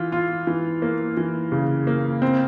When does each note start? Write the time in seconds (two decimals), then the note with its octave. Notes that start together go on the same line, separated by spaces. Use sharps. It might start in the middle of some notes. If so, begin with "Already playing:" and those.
Already playing: E3 F4
0.12 F4
0.47 E3
0.82 A#3
1.17 E3
1.52 C#3
1.87 A#3
2.22 C4